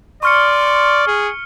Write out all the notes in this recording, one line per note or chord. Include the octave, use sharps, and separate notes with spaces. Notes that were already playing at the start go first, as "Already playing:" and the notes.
D5 C6 C#6 F6 C#7
G#4